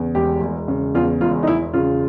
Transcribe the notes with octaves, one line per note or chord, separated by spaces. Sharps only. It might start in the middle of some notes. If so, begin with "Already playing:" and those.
Already playing: E2 C#3
E1 G4
E1
C#3
E2 F4
E1 F4
D#4
E1 E4
C#3 F4